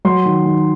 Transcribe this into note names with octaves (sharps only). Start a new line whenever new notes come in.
F#3 C6
D#3
D#3